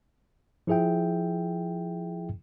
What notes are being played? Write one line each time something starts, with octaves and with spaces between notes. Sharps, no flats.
F3 E4 G#4 E5 G5